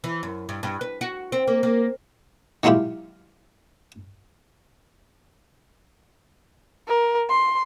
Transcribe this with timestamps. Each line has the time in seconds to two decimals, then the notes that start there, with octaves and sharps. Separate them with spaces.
0.04 E3
0.23 F#2
0.49 G2
0.63 G2
0.81 B4
1.01 F#4
1.32 C4
1.48 A#3
1.63 A#3
2.63 D#3 F#3 G#3 E4 F4 G4
6.88 A#4
7.29 C6